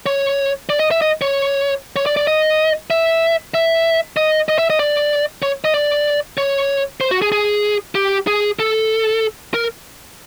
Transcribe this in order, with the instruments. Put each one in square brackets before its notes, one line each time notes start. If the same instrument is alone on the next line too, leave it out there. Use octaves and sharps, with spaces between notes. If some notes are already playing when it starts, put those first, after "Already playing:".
[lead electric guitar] C#5
D5
D#5
E5
D#5
C#5
C#5
D5
D5
D#5
E5
E5
D#5
D#5
E5
D#5
D5
C#5
D#5
D5
C#5
C5
F#4
G#4
G#4
G4
G#4
A4
A#4